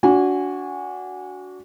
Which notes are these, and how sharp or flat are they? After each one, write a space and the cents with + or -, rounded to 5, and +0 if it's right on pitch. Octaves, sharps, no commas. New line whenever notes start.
D4 -25 F#4 +0 G#5 -20